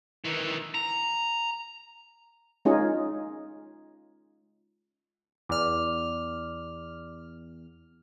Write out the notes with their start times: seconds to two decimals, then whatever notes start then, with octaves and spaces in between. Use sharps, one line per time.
0.25 D#3 E3
0.75 A#5
2.65 G#3 C#4 D#4 F4 G#4
5.49 E2 D5 D6 F6